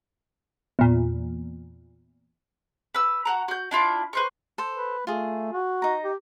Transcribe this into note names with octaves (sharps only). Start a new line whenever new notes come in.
E2 A#2
B4 E6
F#4 F#5 A#5
F#4 G6
D4 E4 F4 D6
B4 C5 C#6
A4 C5
B4
A3 F4 G#4
F#4
D#4 A#5
G4